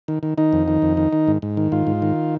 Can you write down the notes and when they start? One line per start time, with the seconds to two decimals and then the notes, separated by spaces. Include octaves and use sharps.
0.08 D#3
0.23 D#3
0.38 D#3 D#4
0.53 F2
0.68 D#3
0.82 F2
0.97 D#3
1.13 D#3
1.28 G#2
1.42 G#2
1.57 D#3
1.72 G#2 F4
1.87 G#2
2.02 D#3